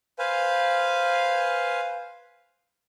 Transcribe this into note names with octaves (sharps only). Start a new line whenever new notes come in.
B4 C5 F5 G#5